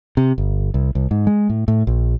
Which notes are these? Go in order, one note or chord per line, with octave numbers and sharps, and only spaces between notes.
C3
G1
C2
C2
G#2
G#3
A2
A2
A#1